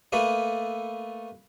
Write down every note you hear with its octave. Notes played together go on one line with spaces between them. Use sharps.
A3 A#3 A4 B4 D#5